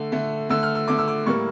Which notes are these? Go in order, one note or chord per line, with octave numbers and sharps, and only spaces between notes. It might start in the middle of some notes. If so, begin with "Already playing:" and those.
Already playing: D3 A3
D3 A3
D3 A3 E6
F6
E6
D3 A3 D6
E6
D6
A2 G3 A#3 C#6